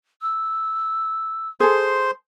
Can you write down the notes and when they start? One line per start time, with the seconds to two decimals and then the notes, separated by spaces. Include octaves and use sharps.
0.22 E6
1.60 G#4 A4 C5 C6